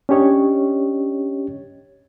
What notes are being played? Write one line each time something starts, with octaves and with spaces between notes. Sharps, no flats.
C#4 D4 G4 C#5 D#5